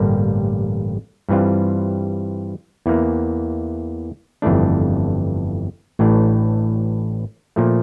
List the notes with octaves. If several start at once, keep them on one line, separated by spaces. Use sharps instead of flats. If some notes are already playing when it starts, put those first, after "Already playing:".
Already playing: A1 G2 D3 G3 A#3
G2 E3 G3 C4 F4
E2 E3 A#3
G1 F2 E3 A3 D4
A1 A2 E3 A3 D4
A#2 F3 A3